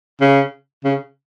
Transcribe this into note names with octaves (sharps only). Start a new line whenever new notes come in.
C#3
C#3